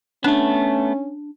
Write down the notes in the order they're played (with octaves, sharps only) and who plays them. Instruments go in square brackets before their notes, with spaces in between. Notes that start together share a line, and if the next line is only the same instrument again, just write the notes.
[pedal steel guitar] A3 B3 [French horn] C#4 [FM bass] D4